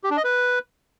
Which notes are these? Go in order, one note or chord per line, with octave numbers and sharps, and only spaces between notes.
G4
D4
D#5
B4